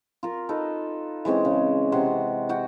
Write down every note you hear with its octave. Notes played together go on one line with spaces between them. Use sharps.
F4 A#4
D#4 A4 B4
E3 G#3 C4 C#4
C#3
C3 F#5 C6
F#4 F#5 G5